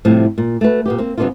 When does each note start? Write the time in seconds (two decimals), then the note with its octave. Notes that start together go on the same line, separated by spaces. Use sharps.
0.05 A2 C3 F3 G3
0.38 A#2
0.61 A3 F#4 B4
0.86 A#2 B3 G4
0.98 A#3 C4
1.18 F#2 C3 B3 D4 D#4 F4